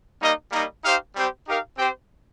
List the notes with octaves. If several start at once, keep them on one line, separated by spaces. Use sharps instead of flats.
G3 A#3 D#4 A#4 D#5
G3 A#3 D#4 A#4 D#5
D#4 G4 C5 F5
G3 C4 G4 C5
D#4 G4 A#4 F5
C4 G4 C5 G5